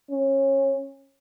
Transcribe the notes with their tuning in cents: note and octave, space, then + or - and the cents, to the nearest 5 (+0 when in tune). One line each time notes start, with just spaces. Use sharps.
C#4 -25